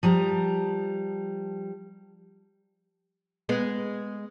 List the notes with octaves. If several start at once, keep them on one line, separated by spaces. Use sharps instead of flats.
F3 G3 A#5
G#3 B3